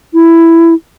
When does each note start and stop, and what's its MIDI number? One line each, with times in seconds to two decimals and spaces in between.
0.14 0.74 64